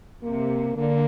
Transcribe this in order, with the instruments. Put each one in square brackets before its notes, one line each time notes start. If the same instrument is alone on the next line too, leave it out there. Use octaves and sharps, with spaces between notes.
[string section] C3 [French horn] A#3
[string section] D3 [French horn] A#3